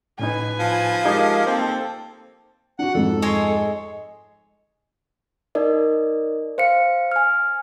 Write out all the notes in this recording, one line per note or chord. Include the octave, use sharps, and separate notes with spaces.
A2 C#4 D#4 B4 G#5
F3
G#3 D#4 G4 A#4 D#5 G#6
A#3 C4 A4 C5
D4 F#4 F#5
F2 G#2 A4
G#3 C#5 C6
D#4 A#4 D5 D#5
C5 F5 C#7
G#5 F6